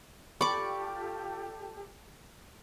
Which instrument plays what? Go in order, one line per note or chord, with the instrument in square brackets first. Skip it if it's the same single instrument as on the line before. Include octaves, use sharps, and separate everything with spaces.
[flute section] F4 G4 A4 [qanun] D5 D6 [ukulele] B5 [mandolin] C#6